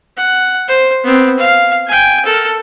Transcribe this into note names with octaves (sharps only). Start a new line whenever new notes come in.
F#5
C5
B3 C4
F5
G5 G#5
A4 A#4